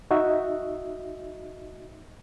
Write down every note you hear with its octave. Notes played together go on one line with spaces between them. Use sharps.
D#4 F#4 D#5 E5